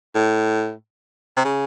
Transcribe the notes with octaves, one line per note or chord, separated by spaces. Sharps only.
A2
C3
C#3